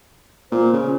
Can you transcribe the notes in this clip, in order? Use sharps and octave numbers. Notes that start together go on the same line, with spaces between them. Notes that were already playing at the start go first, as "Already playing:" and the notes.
A#2 C5
C#3